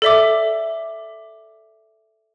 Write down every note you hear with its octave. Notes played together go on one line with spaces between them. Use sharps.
A4 D5 E5 D6